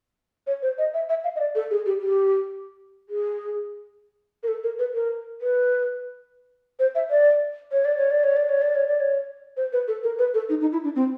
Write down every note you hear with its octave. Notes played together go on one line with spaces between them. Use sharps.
C#5
C5
D#5
E5
E5
F5
D#5
D5
A4
G#4
G4
G4
G#4
A#4
A4
A#4
B4
A#4
B4
C5
E5
D5
C#5
D5
C#5
D5
C#5
D5
C#5
D5
C#5
D5
C#5
C5
B4
A4
A#4
B4
A4
D#4
D#4
E4
D4
C4